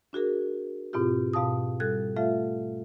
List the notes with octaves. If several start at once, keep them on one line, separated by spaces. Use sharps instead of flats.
D4 F#4 G#4 A#4
G#2 B2 C4 E4 F4 G4
G#2 B2 F5 A5 D#6
G3 A4 F#6 G#6
A3 F4 A4 E5 F5